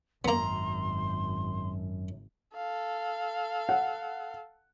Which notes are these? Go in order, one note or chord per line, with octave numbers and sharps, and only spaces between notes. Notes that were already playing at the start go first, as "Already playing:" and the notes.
G#1 F#2 A#3 B3 A#5 C6
A4 F5
F#5